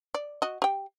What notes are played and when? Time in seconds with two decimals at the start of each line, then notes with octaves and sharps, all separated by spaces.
0.14 D5
0.42 F#4 D#5
0.62 G4 G5